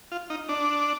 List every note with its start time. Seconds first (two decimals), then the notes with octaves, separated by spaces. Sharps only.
0.12 F4
0.30 D#4
0.49 D4